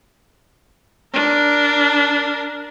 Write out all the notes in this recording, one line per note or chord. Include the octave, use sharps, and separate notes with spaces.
D4 A#4